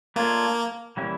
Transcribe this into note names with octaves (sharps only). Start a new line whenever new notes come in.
A3 A#3 D4 F4 A4 C#5
E3 G3 A#3 C#4 E4